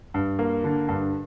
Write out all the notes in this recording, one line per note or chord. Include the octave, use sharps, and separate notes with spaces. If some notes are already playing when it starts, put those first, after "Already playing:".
G2
A#3
D3
G2